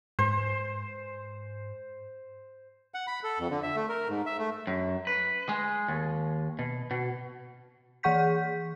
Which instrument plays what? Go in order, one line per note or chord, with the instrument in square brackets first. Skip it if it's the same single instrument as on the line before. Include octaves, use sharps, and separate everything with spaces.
[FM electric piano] G#2 [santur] C5
[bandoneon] F#5
B5
A4
F2
D3
E5
A3
A#4
G#2
E5
A3
[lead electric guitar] F#2
B4
G#3
D#2
B2
B2
[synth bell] E3 G#4 F#5 C#6 G6 B6